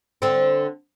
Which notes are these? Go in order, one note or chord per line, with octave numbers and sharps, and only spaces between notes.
D3 C4